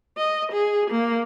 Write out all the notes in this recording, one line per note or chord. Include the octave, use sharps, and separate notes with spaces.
D#5
G#4
A#3